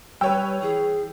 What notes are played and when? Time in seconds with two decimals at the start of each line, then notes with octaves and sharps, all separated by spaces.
0.21 G3 B4 C#5 G5 E6
0.62 E3 G#4